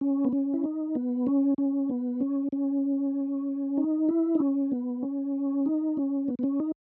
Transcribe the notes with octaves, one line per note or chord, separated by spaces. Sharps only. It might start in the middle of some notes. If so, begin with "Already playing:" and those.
C#4
B3
C#4
E4
D#4
B3
C#4
C#4
B3
C#4
C#4
D#4
E4
D#4
C#4
B3
C#4
D#4
C#4
B3
B3
C#4
D#4